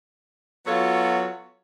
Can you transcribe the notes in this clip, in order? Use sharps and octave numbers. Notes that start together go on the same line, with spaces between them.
F#3 B3 F4 F#4 A4 C#5